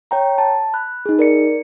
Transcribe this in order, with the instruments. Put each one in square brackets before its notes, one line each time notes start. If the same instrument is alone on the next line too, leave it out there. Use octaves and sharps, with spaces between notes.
[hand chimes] C#5 G5 A#5
A5
B5 F#6
D#4 G#4
A#4 D5 C#7